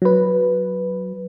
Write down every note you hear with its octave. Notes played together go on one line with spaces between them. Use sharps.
F#3 B4